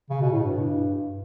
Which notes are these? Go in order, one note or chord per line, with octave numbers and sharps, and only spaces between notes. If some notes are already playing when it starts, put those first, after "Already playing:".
C#3
B2
A2
G2